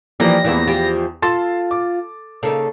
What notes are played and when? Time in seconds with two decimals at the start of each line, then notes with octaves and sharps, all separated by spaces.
0.20 E3 F3 G3 A#3 A#6
0.44 E2 E3 F3 A#3 E4
0.67 F3 G4
1.22 F4 A4 A5 C6 A6
1.71 D6
2.43 C#3 A#3 D#4 A4